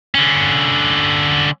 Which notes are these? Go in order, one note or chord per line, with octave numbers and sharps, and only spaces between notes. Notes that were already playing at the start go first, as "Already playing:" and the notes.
D3 C#4